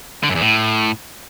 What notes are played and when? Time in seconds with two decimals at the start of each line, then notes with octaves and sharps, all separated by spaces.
0.23 D3
0.29 F#2
0.35 E2
0.41 A2